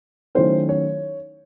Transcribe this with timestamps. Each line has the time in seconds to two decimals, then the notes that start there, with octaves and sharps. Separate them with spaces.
0.35 D#3 F#3 A3 C#4 E4 C5
0.69 C#5